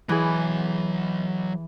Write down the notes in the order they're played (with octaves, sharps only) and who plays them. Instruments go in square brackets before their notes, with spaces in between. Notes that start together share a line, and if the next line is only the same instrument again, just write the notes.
[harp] E3 G#4 [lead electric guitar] F#3 B5